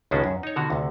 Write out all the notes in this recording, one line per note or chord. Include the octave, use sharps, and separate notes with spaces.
C#2 A2 D#3 C#4 D4 F#4
F#2
D#4 C#5
B2 D3 D#3 F#4
D2 C3